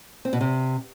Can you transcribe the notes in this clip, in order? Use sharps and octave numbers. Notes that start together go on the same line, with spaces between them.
C4
B2
C3